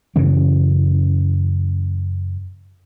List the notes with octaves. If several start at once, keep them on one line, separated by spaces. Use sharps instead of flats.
F#2 C#3 E3 C#4